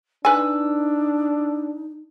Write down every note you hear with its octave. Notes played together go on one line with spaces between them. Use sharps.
D4 D#4 B4 G#5 E6